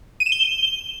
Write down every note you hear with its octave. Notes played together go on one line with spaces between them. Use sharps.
D#7
E7
G7